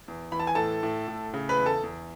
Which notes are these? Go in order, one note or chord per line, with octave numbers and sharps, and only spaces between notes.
E2
E3 B5
A5
G#5
A2 A4 A5
A2
A2
C#3
B4 B5
E2
A4 A5
E2